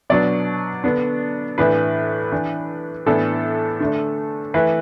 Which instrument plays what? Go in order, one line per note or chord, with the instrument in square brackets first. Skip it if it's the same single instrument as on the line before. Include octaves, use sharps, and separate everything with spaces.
[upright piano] B2 F#3 B3 D4 D5
D3 B3 D4
A2 E3 D4 B4
E3 D4
A2 E3 B3 D4 A4
D3 A3 D4
E3 A3 E4 B4